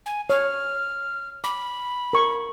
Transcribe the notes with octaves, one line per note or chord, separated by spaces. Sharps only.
G#5
C#5 F6
B5 D6
A#4 C#6